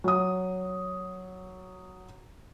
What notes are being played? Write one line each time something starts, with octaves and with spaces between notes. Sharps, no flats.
F#3 D#6